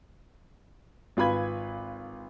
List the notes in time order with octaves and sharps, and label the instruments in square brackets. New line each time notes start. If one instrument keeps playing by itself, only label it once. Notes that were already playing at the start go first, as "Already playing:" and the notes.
[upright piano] G#1 F4 B4 B5 G#6